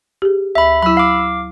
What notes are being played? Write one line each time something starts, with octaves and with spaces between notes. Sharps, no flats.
G4 G#4
D2 E5 B5
F#3 E4 B5 E6
F5 D6